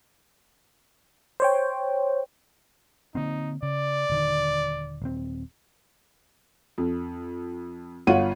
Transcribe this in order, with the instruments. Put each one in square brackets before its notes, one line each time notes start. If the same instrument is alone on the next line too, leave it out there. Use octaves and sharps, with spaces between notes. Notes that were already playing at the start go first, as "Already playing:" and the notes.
[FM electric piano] C5 C#5 G5
[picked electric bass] D3 A#3 C4 [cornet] D#4
[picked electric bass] C#3 [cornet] D5
[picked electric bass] D#1 D3 D#3
D#1 C4
[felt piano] F2
G1 F4 C#5 F#5 D#7